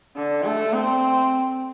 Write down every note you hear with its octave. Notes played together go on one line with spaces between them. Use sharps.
D3
A3
C4